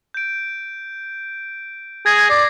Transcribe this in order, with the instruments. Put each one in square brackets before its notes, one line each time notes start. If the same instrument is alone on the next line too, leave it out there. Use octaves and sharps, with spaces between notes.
[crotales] G6 D7
[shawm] G#4 [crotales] G#6 A#6
[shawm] D5 [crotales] C7